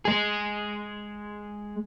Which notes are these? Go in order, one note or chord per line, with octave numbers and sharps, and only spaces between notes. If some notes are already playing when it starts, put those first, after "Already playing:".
G#3 G#4